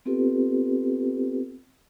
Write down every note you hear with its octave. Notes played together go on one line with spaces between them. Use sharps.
B3 C4 F4 G4 A4 B4